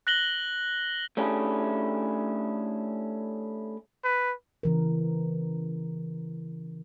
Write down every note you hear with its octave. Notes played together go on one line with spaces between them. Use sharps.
F#6 A#6 F#7 G7
A3 C#4 D4 E4 G4 G#4
B4
C#3 E3 A#4